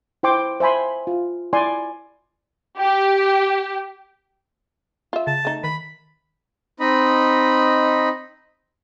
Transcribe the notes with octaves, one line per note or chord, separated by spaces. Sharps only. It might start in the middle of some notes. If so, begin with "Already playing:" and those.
E4 C5 G5 C6 D6
C5 E5 G#5 B5 C6
F4
E4 D5 G#5 C6
G4
F4 E5
C#3 A5
A3 D#4
D#3 B5
C4 D#4 D#5 B5